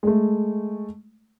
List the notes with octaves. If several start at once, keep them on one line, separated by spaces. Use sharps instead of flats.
G#3 A3